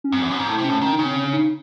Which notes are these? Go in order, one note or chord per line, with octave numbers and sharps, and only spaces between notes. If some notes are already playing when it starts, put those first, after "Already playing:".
C#4
F#2 C4
E2
F#2 C#4
G#2
A2 E4
C3
A2 C#4
D#3 C#4
D#4
C#3
C4
C#4
C#4
D#4